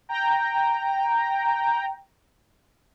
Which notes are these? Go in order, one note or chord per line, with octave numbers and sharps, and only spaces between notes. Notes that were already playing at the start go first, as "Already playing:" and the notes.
G5 A#5